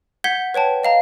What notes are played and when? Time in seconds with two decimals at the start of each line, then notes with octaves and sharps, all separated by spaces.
0.24 F#5 G6 G#6 B6 G7
0.54 B4 C#5 G5 A5
0.83 D#5 F5 A#5